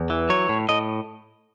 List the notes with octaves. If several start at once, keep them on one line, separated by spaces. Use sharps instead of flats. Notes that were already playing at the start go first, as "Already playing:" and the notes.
Already playing: E2
E3
F#3 C#5
A2
A2 D#5